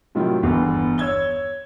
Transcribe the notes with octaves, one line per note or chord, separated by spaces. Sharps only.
A2 C3 D#3 F#3 E4 F4
G1 E2
C#5 E6 G#6 G7